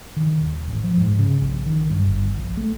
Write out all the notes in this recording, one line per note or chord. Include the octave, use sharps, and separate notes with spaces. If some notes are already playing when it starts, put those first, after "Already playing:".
D#3
D#1
A1
F3
G#2
C#3
A#1
D#3
G2
G1
A#1
A3